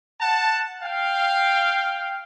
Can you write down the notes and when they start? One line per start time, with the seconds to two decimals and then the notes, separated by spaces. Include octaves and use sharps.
0.21 F#5 A5
0.83 F5 G5